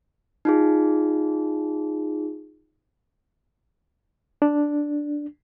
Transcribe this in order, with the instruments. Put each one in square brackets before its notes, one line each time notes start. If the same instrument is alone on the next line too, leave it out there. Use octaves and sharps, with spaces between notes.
[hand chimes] D#4 F4 G#4
[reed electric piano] D4